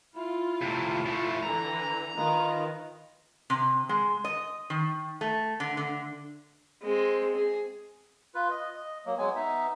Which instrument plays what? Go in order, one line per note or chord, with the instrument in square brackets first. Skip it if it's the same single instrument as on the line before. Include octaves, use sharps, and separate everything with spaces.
[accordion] E4 [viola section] F4
[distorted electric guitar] A2 C3
F3 A3
[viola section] D3 E3 [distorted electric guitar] A#5
[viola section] D#3 [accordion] F4 B4 D#5
[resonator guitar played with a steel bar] C3
G#3
D#5
D#3
A3
D3
D3
[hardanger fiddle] G#3 C4
G#4
[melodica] F4 B4
D#5
D#5
F#3 A#3
F#3 G#3 B3 G#5
B3 D#4 E5